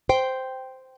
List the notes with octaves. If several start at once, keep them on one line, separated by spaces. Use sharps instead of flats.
C5 G5